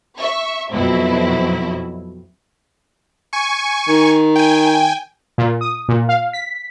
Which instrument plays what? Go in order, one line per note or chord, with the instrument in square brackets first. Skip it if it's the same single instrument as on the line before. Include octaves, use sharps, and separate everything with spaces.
[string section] E5 C#6
F2 B2 F#3 C4 E4
[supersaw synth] G#5 C#6
[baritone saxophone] D#3
[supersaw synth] G5 G#5
[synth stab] A#2
D#6
A#2
F5
B6